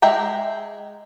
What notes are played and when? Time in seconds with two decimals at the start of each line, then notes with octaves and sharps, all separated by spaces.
0.02 G#3 E5 G5 A#5